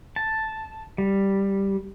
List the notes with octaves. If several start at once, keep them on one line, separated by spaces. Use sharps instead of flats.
A5
G3